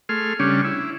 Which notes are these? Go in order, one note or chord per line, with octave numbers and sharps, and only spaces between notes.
A3 G#4 C6 F6
C#3 G3 C#4 D4
E4